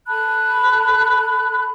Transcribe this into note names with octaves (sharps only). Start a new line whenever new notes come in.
A4 A5 B5 F#6